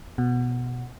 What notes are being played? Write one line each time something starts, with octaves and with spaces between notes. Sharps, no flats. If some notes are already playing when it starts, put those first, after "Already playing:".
B2